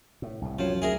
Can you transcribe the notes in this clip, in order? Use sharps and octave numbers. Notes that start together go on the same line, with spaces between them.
A2
C2 A2
F#2 F3 C#5
D2 G#4 A#4 E5